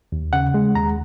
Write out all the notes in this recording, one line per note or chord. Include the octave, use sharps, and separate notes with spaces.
D#2
C#3 F#5
G#3
D#2 A#5